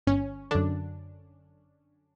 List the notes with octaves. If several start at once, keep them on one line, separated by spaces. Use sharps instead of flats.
G1 C#4
F#2 D3 D4